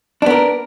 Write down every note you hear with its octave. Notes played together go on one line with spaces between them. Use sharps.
B3 D4 A#4